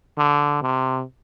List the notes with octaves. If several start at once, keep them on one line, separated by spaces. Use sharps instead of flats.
D3
C3